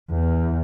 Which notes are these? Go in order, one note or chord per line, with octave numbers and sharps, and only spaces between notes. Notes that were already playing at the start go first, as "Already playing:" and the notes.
E2